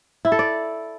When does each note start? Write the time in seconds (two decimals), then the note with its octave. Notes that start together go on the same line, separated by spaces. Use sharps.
0.25 E4
0.32 A4
0.39 D5